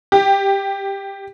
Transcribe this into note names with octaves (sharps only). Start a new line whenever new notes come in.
G4